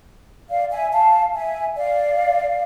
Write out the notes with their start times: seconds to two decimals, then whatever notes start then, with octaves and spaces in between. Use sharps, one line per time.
0.49 D5 F5
0.72 E5 G#5
0.92 F5 A5
1.34 E5 G#5
1.77 D5 F5